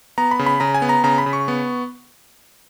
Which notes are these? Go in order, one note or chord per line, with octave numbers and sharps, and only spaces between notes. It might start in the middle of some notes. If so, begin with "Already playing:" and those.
B3 A#5
B5
C#3
B5
C#3 A#5
G#5
B3
A#5
C#3 A#5
B5
C#3
C#6
B3